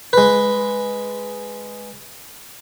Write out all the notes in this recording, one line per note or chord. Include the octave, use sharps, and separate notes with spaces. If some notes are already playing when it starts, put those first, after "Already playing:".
G#3 B4